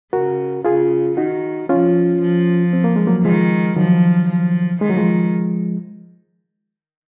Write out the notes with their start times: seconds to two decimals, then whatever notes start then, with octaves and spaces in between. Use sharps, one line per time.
0.13 C#3 F#4 A#4
0.65 C#3 F4 G#4
1.17 D#3 D#4 F#4
1.69 F3 C#4 F4
2.21 F3
2.73 C4
2.84 A#3
2.96 G#3
3.07 F#3 A#3
3.25 D#3 F3 G#3
3.76 D#3 F3 F#3
4.29 F3
4.81 D#3 G#3
4.89 F#3
4.97 F3 G#3